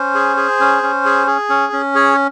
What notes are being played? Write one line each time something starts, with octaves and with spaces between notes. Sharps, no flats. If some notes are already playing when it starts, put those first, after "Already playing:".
Already playing: C#4 C5
G#4
G#4
C#4
C#4
G#4
G#4
C#4
C#4
G#4 C#5